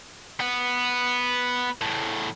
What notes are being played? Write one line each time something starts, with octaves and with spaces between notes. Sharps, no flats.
B3
E2 A2